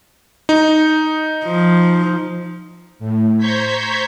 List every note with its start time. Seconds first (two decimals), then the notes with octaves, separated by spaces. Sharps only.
0.49 D#4
1.45 F3
2.99 A2
3.38 C5 A#5 C#6 G6 G#6 B6